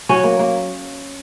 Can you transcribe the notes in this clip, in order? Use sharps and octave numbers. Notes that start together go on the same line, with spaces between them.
F#3 C#4
A#3
A#3